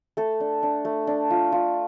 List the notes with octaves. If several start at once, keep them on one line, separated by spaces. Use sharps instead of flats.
A3 A4
D4
D4
A3
D4
F4
F4